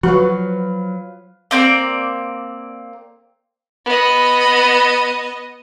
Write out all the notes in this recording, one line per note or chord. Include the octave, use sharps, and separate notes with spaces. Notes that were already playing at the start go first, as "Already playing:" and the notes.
F3 F#3 F#4 B4 F5
A#3 C4 D5
B3 D#5